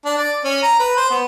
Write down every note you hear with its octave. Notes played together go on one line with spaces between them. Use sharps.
D4
D5
C#4
A#5
B4
C5
B3